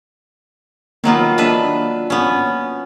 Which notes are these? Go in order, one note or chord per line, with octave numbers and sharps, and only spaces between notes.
D#3 F#3 A#3 B3 F4
D4 B4 E5
B3 C#4